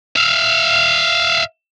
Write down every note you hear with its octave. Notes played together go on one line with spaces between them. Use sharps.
E5 F5